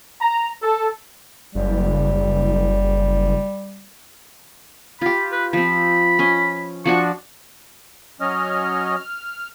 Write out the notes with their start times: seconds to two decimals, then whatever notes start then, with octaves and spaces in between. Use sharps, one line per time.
0.21 A#5
0.63 A4
1.55 F#1 G3
5.01 F4 G4 B5
5.32 B4
5.53 F3 C4 B5
6.19 C#4 D#5
6.85 F3 D4 F#4 C#6
8.21 F#3 C#4 D#5 F6
8.96 F6